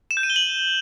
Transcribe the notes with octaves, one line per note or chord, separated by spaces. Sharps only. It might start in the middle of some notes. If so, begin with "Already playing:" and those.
E7
G6
D#7
G7
F#7